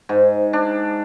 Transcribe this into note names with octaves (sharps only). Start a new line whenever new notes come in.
G#2
D4